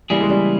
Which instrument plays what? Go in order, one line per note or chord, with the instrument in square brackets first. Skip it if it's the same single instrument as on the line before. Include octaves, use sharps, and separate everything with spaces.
[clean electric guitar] C#3 E3 A#3 E4 G#4 [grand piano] G3
[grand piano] G#3
G3